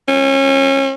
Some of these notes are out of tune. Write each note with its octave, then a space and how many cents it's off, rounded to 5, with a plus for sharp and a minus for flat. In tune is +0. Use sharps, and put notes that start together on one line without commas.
C#4 -30